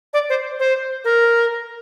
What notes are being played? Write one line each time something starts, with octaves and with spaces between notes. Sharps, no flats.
D5
C5
C5
A#4